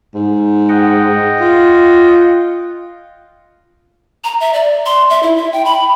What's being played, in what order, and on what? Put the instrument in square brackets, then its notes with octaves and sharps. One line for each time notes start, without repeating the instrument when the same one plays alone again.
[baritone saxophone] G#2
[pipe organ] D#5 F#5 G5
[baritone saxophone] F4
[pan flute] A#5
E5
D5
C6
E5
E4
E5
G5
B5